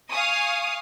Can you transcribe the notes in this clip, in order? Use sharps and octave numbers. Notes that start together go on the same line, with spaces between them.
F5 G#5 C#6 D#6